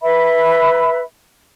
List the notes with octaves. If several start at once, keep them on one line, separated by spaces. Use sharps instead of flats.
B4 E5 B5